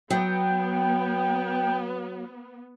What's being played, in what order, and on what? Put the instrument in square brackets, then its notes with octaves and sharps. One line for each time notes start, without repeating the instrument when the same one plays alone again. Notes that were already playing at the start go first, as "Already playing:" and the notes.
[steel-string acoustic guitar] F#3 [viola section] B3 [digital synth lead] G5